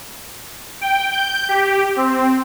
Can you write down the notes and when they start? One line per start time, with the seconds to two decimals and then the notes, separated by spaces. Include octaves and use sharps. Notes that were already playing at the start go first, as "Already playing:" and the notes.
0.81 G5
1.12 G6
1.49 G4
1.96 C4